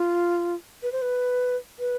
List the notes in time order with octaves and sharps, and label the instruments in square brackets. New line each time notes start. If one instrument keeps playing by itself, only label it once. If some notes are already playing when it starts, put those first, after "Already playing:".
Already playing: [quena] F4
B4
C5
B4
B4